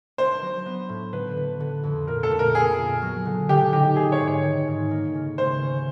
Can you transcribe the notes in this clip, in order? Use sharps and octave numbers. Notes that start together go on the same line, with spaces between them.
D4 C5
F#3
B3
A2
D3 B4
D3
D3
F2
A#2 A#4
A4
A#2
A#4
B3 G#4
A#2
F#3
D3
D3 G4
D#4 G4
D#3 G#4
C#5
G#2
C#5
D#3
G#2
A#3
C#3
C#4 C5
C#4